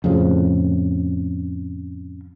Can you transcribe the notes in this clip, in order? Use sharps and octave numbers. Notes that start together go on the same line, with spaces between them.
F2 A2 C#3 F3